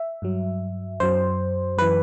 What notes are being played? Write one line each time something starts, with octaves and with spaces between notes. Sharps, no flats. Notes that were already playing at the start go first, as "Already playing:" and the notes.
Already playing: E5
G2 F#3
F#2 F#3 C5
F#2 E3 B4